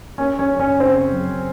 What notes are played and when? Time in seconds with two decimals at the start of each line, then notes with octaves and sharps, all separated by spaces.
0.18 A#3 C#4 C#5
0.39 C#4 C#5
0.50 F#2
0.60 C#4 C#5
0.80 C#3 C4 C5
1.12 F#3